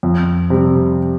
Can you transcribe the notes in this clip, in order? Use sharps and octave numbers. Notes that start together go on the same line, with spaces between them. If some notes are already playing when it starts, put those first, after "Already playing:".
F2
C3 G3